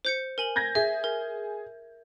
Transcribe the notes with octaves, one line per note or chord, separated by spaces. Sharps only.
C5 G6 C#7
A#4 G#5 F#7
G6 G#6 A#6
G#4 E5
A#4